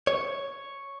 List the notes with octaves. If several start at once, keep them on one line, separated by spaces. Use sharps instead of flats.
C#5